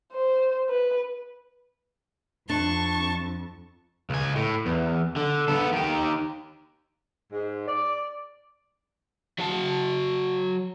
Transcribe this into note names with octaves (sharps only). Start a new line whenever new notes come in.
C5
B4
F2 D4 A5 C#6
C#2 G#5
A2
E2
D3
B3 A4
D#3 G4
G#2
D5
F#3 F#4 A5